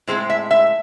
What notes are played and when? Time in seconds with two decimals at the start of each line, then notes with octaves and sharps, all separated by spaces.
0.07 A2 G#3 C4 C5
0.30 E5
0.51 E5